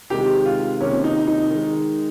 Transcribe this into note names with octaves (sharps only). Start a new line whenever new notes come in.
C3 D#3 G#3 G4
F4
C3 D#3 A#3 C#4
D#4
D#4
D#3 G#3